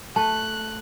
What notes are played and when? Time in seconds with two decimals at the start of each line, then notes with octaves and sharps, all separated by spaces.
0.16 A3 A5 F#6